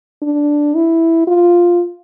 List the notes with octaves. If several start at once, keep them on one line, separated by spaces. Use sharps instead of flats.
D4
E4
F4